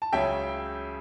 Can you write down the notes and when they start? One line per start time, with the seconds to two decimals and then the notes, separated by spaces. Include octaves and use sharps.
0.02 A5
0.13 C#2 C#3 F#3 C#4 E5 G5